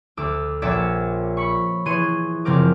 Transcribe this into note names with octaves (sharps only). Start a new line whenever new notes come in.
D2 D6 E6
A#1 C#4 D5 E5 D6 E7
B5 C#6
E3 G#4 C6 C#6 D#7
F#1 C#3 F3 C4 A#4 D6